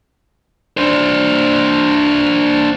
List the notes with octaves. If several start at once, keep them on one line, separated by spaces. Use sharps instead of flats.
D4 C5